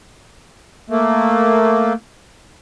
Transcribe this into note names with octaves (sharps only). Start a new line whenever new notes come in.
A3 A#3